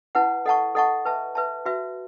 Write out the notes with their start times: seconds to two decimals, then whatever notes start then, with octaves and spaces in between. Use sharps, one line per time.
0.15 E4 B4 F#5 A5
0.46 A4 D#5 F#5 A5 C#6
0.75 A4 D#5 F#5 A5 C#6
1.05 B4 E5 A5
1.35 B4 E5 A5
1.65 F#4 B4 E5